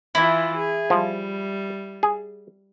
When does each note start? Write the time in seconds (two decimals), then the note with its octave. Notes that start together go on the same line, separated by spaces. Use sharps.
0.15 E3 E4 F4
0.56 G#4
0.90 F3 G3
2.03 G#4